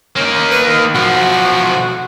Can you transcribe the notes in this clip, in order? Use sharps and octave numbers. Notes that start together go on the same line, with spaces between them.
A#3 C#4 D#4
B4
D#3
B1 F3 F#4